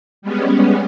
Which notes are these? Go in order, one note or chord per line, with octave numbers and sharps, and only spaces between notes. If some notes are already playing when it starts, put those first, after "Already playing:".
G3 G#3 B3 C#4